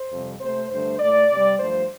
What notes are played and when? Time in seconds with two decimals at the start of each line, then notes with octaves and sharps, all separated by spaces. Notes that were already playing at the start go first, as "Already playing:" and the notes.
Already playing: C5
0.11 F2 C3 G3
0.40 C3 A3 C5
0.70 G2 D3 A3 C5
1.00 A2 A3 D5
1.30 C3 G3
1.59 G2 F3 A3 C5